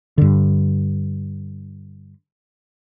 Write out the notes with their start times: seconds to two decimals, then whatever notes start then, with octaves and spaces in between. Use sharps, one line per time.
0.18 G2 D3